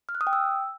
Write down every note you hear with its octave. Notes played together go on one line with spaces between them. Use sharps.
F6
F#6
D#6
G5
E6